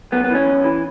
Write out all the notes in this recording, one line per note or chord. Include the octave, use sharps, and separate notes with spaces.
F#2 B3
B3
E3 C#4
F#2
E3